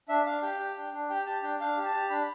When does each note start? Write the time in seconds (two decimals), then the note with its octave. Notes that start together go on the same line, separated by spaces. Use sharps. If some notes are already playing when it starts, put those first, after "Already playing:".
0.09 D4 E5
0.26 D4 F5
0.42 G4 G5
0.59 G4
0.76 D4
0.93 D4
1.10 G4 G5
1.26 G4 A5
1.43 D4 G5
1.60 D4 F5
1.77 G4
1.85 A5
1.94 G4
2.10 D4 B5